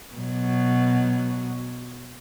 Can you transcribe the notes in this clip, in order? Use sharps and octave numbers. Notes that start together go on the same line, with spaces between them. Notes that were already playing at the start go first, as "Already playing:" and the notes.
B2 F#3